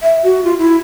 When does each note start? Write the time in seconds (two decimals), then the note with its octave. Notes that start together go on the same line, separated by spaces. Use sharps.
0.03 E5
0.24 F#4
0.44 F4
0.59 E4